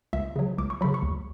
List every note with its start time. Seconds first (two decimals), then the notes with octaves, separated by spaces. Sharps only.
0.13 C#2 E5
0.36 C#3 F#3
0.58 C#2 D6
0.70 C#6
0.81 C#3 F#3 B5
0.94 C#6
1.02 D2